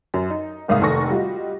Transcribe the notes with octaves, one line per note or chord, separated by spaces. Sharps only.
F#2
D#4
F#1 C2 G#2 F5 D#6
F1 D#3 A4 C#6 A#6
G3 F4 F#4 D#5